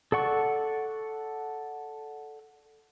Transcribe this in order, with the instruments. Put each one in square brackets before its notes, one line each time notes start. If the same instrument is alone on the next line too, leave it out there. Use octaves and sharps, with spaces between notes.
[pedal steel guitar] A4 D5 F#5 C#6